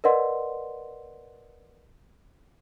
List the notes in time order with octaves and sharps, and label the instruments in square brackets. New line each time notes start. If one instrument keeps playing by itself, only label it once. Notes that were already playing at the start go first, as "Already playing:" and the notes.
[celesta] A#4 B4 D5 D#5 F#5 C6